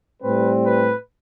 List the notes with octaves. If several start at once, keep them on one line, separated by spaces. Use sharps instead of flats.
A2 G3 C4 B4
B4